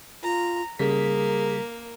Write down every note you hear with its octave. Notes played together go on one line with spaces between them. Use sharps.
F4 A#5
C#3 G3 A#3 G#4 B6